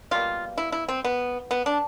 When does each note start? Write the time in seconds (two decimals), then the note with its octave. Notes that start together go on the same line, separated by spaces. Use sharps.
0.11 B2 G3 A#3 F4
0.58 E4
0.72 E4
0.88 C4
1.04 B3
1.51 B3
1.66 D4